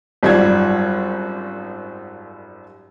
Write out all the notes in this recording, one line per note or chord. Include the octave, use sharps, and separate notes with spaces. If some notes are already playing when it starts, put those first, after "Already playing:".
G#1 F#2 G3 F4 G#6